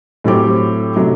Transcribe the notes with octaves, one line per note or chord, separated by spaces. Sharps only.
A2 F#3 C4 G4
C3 F#3 A3